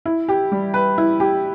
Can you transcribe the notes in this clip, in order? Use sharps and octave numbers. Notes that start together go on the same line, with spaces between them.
E4
G4
G3
B4
E4
G4